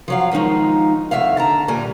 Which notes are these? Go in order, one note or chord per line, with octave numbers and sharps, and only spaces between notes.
F3 F#3 F5
D#3 F3 G#3 D#4 F4
F2 A2 C#3 F#3 E5 F5
D3 A5 A#5
D2 A#2 G3 G#5